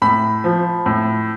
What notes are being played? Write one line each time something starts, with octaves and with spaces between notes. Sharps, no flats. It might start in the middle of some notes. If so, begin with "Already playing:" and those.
A2 B5
F3
A2